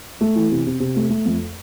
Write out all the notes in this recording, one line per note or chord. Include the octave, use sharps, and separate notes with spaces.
A3
E3
C3
C3
C3
A3
A3
F2